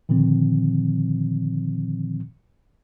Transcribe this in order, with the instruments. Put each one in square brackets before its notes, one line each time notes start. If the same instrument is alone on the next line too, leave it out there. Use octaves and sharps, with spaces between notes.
[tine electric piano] A#2 D3 D#3 F3 C4